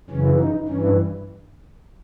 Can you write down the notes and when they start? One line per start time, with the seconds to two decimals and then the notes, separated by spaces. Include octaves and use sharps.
0.10 F#2 C#3 E3 C#4
0.39 D#4
0.68 G2 E3 C#4